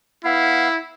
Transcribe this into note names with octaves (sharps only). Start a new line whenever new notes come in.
B3 E4 F5